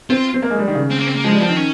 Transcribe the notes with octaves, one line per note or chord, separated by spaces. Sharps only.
C4 F4
C4
A#3
G#3
G3
D#3
C#3
C4
A#3
C4
A#3
F3 G#3
G3
F3 C4
D#3
C#4